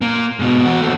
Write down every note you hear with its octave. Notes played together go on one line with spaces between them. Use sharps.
A#2 A#3
G#2 B2
E2 F#4
D#2 A3